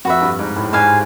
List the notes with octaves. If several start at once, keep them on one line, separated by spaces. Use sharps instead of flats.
F2 F#4 B4 E5
G2
G#2
A2
G#2 C5 F5 G#5